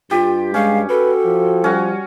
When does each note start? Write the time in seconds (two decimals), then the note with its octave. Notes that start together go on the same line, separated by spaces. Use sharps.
0.11 G2 F4 G4
0.54 G#3 C#4 F5
0.90 F#4 A4 B4
1.25 F3
1.64 G3 C#4 F#4